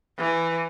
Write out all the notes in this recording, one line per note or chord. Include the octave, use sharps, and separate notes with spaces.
E3